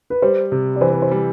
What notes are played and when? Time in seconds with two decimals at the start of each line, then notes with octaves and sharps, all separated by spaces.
0.10 B4
0.22 G3 C5
0.52 C3
0.76 D5
0.81 E3 C5
0.92 B4
1.02 C5
1.11 G3